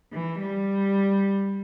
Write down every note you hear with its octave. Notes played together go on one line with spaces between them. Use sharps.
E3
G3